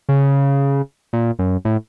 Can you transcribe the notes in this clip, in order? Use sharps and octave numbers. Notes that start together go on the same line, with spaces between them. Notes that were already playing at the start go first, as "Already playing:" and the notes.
C#3
A#2
F#2
A2